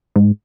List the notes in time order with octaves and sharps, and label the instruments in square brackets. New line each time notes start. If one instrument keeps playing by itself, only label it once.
[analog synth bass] G#2